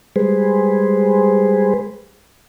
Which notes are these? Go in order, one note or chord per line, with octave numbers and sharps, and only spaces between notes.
G3 G#3 G#4 B4 C5